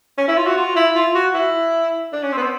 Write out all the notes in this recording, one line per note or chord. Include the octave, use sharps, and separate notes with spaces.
C#4
E4
F4
F#4
F4
E4
F4
F#4
E4
D4
C#4
C4
B3
C4